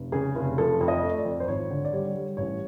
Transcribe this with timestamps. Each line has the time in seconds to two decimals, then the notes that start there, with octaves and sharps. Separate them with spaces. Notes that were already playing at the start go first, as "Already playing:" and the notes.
Already playing: F1
0.12 C#3 G#4
0.35 F1
0.58 F3 A4
0.81 F2
0.88 D#5
1.03 A3
1.18 D5
1.25 F2
1.40 C5
1.48 G#1 C#5
1.70 D3
1.85 D5
1.93 G3 C#5
2.14 G3
2.37 A1 C#5